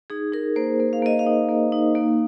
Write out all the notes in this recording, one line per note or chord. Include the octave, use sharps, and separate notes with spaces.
D#4 G#4
D#4 A#4
A#3 C5
A#3
F5
A#3 D#5
F5
D#4
A#3
D#4
A#3